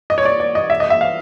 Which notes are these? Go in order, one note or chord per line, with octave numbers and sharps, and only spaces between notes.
D#5
C#5
D5
D5
D#5
E5
D#5
E5
F5